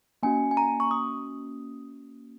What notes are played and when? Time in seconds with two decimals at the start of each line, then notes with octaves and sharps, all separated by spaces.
0.23 A#3 C#4 F#4 G#5
0.51 G#5
0.57 A#5
0.80 C#6
0.91 D#6